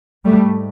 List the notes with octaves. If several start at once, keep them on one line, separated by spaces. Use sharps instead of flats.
G#2 G3 A3